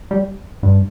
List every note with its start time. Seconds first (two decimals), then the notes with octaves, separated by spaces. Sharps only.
0.11 G3
0.63 G2